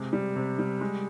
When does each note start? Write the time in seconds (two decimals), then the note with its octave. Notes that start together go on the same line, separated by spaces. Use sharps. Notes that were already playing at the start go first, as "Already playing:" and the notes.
Already playing: C3 G#3
0.13 G3
0.36 C3
0.59 G3
0.81 G#3